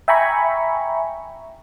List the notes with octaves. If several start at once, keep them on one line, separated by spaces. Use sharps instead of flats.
E5 G5 G#5 A#5 B5 C#6